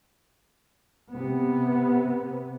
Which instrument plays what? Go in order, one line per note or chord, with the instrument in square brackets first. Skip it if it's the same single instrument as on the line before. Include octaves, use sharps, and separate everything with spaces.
[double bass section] C3 B3